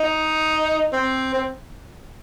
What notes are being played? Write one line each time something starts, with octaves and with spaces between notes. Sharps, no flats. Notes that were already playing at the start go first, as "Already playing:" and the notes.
Already playing: D#4
C4
C4